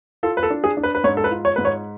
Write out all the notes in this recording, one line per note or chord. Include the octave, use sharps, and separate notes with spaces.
F4 A4
B4
A4
D4
G#4
D4
B4
B4
G#2 C#5
A4
B4
F4
C#5
G#2 B4
C#5